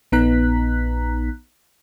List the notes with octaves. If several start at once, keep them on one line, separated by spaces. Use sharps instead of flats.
A#1 B3 D#4 A#5 F#6 B6